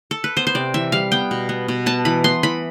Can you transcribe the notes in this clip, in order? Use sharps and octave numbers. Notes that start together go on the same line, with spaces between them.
A4
B4
B3 C5
C5
C3 D5
E3 E5
G3 F5
B3 G5
B2
B3
B2
B3 A5
E3 B5
B3 C6
E3 B5